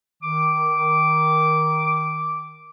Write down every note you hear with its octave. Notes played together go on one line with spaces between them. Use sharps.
D#3 D6